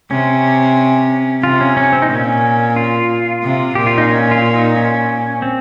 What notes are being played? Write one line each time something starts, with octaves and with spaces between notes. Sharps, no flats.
C3 C#4
C3 F4
C#4
C#4
C4
D#4
A#2 C#4
F4
C3
A#2 G4
F4
D#4
C#4
F4
D#4
C#4
C4